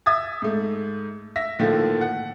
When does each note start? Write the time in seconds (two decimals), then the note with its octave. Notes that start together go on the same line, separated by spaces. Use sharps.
0.06 E5 D#6 G#6 A6
0.42 G#2 A3
1.36 E5 A#6 B6
1.59 A2 D3 D#3 F3 A3 A#3
2.01 F#5